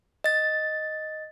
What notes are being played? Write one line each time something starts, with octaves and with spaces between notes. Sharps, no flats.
D#5 A6